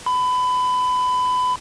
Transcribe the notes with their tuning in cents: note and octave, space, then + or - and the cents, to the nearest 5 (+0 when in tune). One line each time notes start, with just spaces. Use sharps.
B5 +25